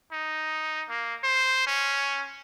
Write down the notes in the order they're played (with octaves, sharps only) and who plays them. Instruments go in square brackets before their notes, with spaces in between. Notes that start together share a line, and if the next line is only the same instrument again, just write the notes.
[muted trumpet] D#4
A#3
C5
C#4